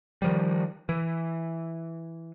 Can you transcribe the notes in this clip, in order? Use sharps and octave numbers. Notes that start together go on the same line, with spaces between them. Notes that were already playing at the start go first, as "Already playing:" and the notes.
D#3 F3 G3
E3